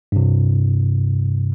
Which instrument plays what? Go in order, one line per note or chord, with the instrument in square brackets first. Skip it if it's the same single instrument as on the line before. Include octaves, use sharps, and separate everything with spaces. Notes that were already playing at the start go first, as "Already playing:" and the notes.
[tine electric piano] G2 C3